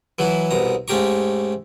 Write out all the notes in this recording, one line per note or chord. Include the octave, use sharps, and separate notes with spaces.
E3 F#3 E4 F#4
C2 B2 A#5
G#2 A3 C#4 G4 A#5 C#6